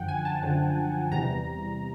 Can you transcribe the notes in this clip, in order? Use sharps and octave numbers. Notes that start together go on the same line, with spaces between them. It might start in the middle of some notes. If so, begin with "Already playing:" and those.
Already playing: F#2 D3 F3 F#5 G5
G#5
A5
F#2 D3 F3
E2 C3 E3 G3 A#5